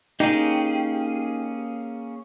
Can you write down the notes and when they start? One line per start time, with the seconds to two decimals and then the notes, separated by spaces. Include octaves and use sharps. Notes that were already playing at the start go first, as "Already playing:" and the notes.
0.20 A#3 C#4 D#4 G4 G#4